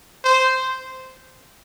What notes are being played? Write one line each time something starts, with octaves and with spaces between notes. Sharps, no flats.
C5